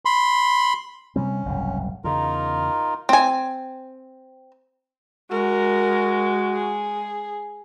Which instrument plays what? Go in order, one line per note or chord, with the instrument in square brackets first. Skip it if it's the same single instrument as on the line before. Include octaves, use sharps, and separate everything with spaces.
[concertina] B5 C6
[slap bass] C3 G3 C4 [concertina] C#4
[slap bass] F#1 C2 G#2
[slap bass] E2 C#3 [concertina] D#4 F4 A#4
[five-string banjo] C4 G#5
[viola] G#3 [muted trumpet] F#4 [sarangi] A#4
[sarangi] G#4